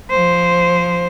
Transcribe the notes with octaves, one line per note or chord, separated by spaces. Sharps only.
F3 C5